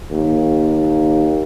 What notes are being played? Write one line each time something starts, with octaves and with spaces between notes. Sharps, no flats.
D#2